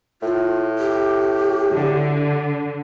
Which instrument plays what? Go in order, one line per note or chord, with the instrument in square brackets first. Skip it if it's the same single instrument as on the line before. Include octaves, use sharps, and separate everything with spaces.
[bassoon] A2 [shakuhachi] F4
[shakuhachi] G4
[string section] D3